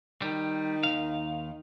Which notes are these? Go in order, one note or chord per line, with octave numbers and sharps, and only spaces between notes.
D#3 G3
D#2 E3 F5